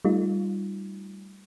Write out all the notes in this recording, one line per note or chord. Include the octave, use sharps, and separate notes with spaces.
G3 A3 D#4 F4